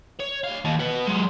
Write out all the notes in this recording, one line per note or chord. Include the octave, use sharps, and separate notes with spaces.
C#5
D4 F5
D#2
F#4 B4
F#3 G#3